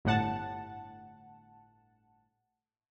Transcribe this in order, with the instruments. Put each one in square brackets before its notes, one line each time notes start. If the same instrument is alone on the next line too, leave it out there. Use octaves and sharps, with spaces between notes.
[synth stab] G1 A2 F#5 A5